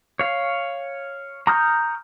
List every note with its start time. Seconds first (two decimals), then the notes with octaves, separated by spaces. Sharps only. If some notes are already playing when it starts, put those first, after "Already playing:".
0.19 C#5 F5
1.47 A#5 C#6 D#6 F6 G6